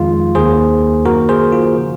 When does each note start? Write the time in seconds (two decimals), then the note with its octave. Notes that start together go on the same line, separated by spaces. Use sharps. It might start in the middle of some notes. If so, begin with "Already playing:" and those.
Already playing: F2 D#3 G#3 F4
0.35 D#2 D#3 A#3 G#4 C5
1.05 F#2 D#3 A#3 F#4 A#4
1.29 G#4 C5
1.52 F4
1.76 C#3 F3